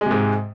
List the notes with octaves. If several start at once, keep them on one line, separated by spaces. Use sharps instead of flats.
G#2 C3 G#3